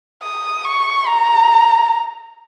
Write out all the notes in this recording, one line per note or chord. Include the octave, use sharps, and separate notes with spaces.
D#6
C#6
A#5